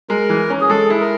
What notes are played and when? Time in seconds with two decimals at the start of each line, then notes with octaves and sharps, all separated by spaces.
0.09 G#3 A#4
0.30 E3
0.50 C#4
0.61 G#4
0.70 G#3 A4
0.90 E4
1.01 A#4